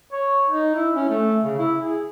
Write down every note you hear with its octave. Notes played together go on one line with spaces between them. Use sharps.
C#5
D#4
E4
C#4
A3
C#3
E4
G#4